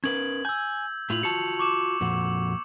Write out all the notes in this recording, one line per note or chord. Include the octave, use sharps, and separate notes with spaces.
C#4 A#4 B4 G#6 F#7
G#5 E6 G6
A2 E4 F4 F7 F#7
F4 F#4 A5 C#7
C#6 D6 E7
F2 A#2 F#4